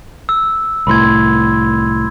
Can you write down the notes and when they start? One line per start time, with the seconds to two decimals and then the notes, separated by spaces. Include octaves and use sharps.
0.29 E6
0.87 C2 A2 B5 C6 G#6